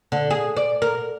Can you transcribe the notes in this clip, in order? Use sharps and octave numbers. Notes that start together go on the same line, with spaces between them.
D3
G#4
D5
A#4